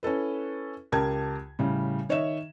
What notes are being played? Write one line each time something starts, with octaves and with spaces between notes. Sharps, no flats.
C#4 E4 A4 B4
C#2 G4 A#4 A5 G#6
A2 C#3 G3
D#3 C#5 D#5 E5 E7